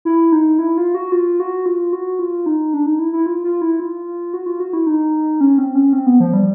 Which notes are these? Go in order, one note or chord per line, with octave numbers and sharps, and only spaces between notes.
E4
D#4
E4
F4
F#4
F4
F#4
F4
F#4
F4
D#4
D4
D#4
E4
E4
F4
F4
E4
F4
F#4
F4
F#4
E4
D#4
C#4
C4
C#4
C4
B3
F3
G3